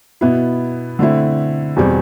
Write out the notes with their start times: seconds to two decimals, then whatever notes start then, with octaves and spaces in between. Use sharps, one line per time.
0.21 B2 B3 E4
0.99 D3 A3 C4 E4
1.76 E2 B2 G3 C4